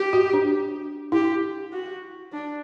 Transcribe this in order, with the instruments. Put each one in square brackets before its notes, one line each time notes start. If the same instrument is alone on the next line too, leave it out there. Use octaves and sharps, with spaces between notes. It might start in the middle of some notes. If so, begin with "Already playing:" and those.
Already playing: [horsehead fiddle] G4
[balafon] F#4
D4
[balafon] E4 [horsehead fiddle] G4
[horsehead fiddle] F#4
D4